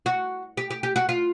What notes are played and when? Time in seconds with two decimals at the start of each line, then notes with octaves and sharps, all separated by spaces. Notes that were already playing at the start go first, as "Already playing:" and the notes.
0.06 F#4
0.57 G4
0.71 G4
0.83 G4
0.96 F#4
1.09 F4